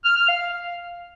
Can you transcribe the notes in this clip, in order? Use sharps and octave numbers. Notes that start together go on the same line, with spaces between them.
F6
F6
F5